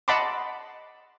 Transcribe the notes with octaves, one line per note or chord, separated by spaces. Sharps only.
D#5 F#5 A5 B5 C6 D6